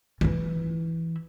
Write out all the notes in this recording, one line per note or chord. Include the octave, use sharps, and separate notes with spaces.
E3 E4